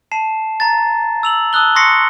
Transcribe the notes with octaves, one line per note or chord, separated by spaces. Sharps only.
A5 C7 E7
A#5 A6
E6 F7 F#7
A5 D#6 E6 F#6 G7
C6 C#6 D#6 A#6 C7 C#7